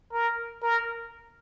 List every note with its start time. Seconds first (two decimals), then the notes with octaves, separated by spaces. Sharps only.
0.13 A#4
0.62 A#4